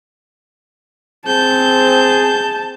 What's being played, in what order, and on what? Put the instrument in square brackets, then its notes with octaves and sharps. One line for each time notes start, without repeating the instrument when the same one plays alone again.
[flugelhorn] C4 [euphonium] G#4 [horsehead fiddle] A5 [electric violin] G6